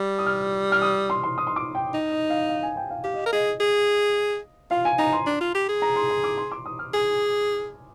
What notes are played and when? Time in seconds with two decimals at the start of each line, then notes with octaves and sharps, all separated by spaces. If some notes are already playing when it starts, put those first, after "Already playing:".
Already playing: G3
0.19 D#6
0.26 F6
0.72 F6
0.82 D#6
1.10 C6
1.24 C6
1.38 D#6
1.47 C6
1.56 D6
1.75 G5
1.94 D#4
2.12 D#5
2.30 F5
2.49 F5
2.63 G#5
2.77 G5
2.90 F5
3.04 G4 F5
3.14 D#5
3.26 A#4
3.33 G#4 D#5
3.60 G#4
4.71 F4 F5
4.85 G#5
4.98 D#4 A#5
5.12 C6
5.26 D4
5.41 F4
5.55 G4
5.68 G#4
5.82 A#5
5.96 C6
6.10 C6
6.24 D6
6.38 C6
6.52 D6
6.66 D#6
6.79 F6
6.94 G#4 G#5